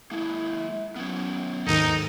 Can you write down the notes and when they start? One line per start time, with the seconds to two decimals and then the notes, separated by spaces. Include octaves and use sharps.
0.11 G#3 A#3 E4
0.96 F#3 B3 C#4
1.67 D#2 G#2 D#3 D#4 A4 A#5